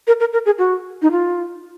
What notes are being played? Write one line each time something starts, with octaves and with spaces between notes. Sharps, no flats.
A#4
A#4
A#4
G#4
F#4
D#4
F4